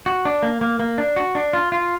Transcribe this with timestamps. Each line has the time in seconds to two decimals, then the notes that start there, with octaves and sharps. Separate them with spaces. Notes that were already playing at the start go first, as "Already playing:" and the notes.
0.06 F#4
0.25 D4
0.43 A#3
0.61 A#3
0.80 A#3
0.98 D4
1.16 F#4
1.35 D4
1.53 F4
1.72 F4